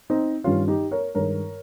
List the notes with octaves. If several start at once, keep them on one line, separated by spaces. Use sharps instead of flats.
C4 D#4
G2 D#3 G3 C#4 F4
D#4 G4
A#4 C#5
G2 D#3 G#3 A#4 C#5